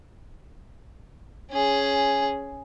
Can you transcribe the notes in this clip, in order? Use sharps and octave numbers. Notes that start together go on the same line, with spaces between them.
C#4 G#4